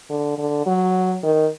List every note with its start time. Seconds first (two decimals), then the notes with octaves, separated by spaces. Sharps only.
0.10 D3
0.38 D3
0.66 F#3
1.23 D#3